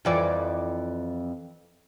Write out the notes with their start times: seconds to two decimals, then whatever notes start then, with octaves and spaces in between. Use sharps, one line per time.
0.05 F2 E3 D5